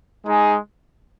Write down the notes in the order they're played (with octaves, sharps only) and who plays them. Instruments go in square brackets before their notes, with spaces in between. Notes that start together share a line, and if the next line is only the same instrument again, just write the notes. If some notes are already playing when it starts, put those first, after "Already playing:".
[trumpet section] G#3 D#4 G#4